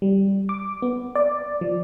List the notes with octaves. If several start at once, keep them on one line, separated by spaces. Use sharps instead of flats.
G3
D6
B3
D5
F3